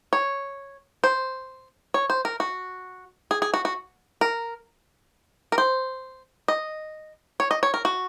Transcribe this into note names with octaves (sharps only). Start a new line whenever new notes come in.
C#5
C5
C#5
C5
A#4
F#4
G#4
G#4
F#4
F#4
A#4
A#4
C5
D#5
C#5
D#5
C#5
A#4
F#4